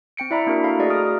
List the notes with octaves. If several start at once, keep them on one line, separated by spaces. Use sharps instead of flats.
C4 G5 C#7 D7
E4 D5 E5 A#5 B5
A#3 D4 E4 F#4 A#4
A4 F5 A#5 B5
A3 F#4 G#4 D5 D#5
A#5 D#6 F6 D7